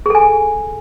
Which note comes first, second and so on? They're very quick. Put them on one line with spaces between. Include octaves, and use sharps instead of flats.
G#4 A4 G#5